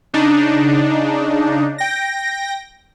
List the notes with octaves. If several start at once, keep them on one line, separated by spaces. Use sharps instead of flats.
C#3 D4 D#4
G5 A#6